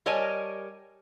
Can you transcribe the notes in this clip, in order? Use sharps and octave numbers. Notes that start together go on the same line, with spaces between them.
G3 A#4 C#5 D#5 G#5 A5